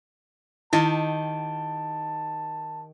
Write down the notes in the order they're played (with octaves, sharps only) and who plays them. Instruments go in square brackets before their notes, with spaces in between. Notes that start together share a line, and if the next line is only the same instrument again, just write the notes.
[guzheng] D#3 G4 [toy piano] E4 D#5 [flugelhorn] A5